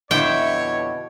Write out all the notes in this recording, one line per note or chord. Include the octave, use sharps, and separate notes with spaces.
F2 B2 D3 E4 C#5 G5